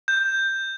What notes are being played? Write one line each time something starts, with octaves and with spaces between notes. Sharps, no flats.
G6